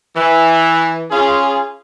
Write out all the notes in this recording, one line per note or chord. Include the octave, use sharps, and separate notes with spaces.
E3
C#4 F4 G#4